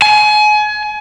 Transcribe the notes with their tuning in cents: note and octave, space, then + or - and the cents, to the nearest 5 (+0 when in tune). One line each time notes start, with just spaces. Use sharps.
G#5 +30